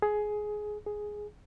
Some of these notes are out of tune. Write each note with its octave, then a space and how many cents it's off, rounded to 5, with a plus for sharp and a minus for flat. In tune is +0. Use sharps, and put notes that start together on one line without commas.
G#4 +15
G#4 +5